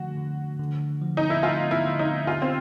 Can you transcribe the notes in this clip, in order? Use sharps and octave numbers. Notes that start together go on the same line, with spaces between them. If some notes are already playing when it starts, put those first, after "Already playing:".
Already playing: D3 F3 A3 F#4
D3
D3
F3
D#4
E4
A3 F4
E4
D3
D#4
F4 G4
C4